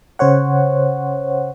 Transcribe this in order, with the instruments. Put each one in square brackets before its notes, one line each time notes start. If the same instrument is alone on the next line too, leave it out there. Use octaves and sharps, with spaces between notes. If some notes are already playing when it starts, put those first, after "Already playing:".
[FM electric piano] C#3 C5 C#5 F#5